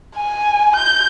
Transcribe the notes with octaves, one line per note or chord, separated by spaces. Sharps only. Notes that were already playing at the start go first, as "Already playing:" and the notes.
G#5
G6